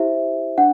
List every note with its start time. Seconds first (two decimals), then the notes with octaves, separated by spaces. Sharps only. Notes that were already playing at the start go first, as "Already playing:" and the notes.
Already playing: E4 G4 C5 E5
0.58 D4 F#5